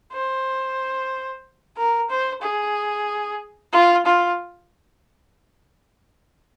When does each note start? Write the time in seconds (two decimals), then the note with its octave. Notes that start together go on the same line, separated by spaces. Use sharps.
0.13 C5
1.77 A#4
2.10 C5
2.42 G#4
3.73 F4
4.06 F4